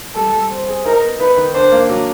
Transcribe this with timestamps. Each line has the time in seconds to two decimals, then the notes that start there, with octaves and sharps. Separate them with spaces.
0.15 G3 A4
0.33 G3
0.50 C4
0.68 G#4
0.85 D#4 A#4
1.02 B3
1.20 D#4 B4
1.37 D#3
1.54 D4 C5
1.72 A#3
1.89 F#3